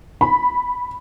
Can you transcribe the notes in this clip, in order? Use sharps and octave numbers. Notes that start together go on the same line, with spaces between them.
B5